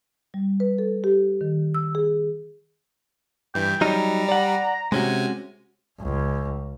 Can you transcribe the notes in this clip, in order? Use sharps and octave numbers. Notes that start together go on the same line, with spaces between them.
G3
B4
A4
G4
D#3
E6
G#4
G2 E3 G5
F#3 G3 D#4 A#5
D5 F#5
C3 G#3 C#4 F#4 G#5
C#2